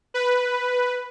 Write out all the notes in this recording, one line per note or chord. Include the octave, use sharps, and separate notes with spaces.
B4